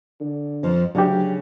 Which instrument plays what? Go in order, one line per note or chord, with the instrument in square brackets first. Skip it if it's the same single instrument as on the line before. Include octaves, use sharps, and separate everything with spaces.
[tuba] D3
[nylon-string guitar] F2 F3
[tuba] D2 [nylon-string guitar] C#3 [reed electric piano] F#3 D4 G4